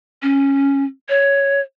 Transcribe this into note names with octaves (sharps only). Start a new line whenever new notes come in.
C#4
C#5